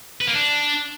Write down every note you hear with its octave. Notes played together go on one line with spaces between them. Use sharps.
B4
A#3
D4